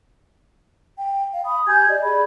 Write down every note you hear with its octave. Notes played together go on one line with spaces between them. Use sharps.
G5
F5
B5 D#6
G4 G#5 G6 G#6
D5 D#5
G#4 D5 B5